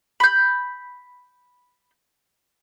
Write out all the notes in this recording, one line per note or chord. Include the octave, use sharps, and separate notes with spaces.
B5 G6